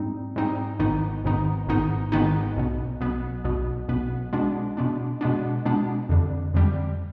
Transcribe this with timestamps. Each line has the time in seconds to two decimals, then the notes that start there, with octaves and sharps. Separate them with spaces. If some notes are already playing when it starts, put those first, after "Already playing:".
Already playing: G#2 G3 C4 D#4
0.36 G#2 G3 C4 D#4
0.79 G#1 G#2 D#3 B3 D#4
1.24 G#1 G#2 D#3 B3 D#4
1.67 G#1 G#2 D#3 B3 D#4
2.12 G#1 G#2 D#3 B3 D#4
2.57 B1 B2 B3
3.01 B1 B2 B3
3.44 B1 B2 B3
3.88 B1 B2 B3
4.33 B2 G#3 B3 D4
4.77 B2 G#3 B3 D4
5.21 B2 G#3 B3 D4
5.65 B2 G#3 B3 D4
6.09 F2 D3 G3
6.54 F2 D3 G3